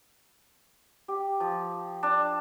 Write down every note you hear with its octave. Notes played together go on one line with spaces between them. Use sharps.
G4
F3
D4